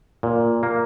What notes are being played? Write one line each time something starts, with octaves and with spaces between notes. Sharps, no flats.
A#2
A#3